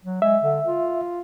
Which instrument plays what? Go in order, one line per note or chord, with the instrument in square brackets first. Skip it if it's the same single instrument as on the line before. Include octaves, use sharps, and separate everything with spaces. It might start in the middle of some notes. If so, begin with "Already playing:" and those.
[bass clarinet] F#3
[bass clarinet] G#3 [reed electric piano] E5
[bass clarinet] D3
F4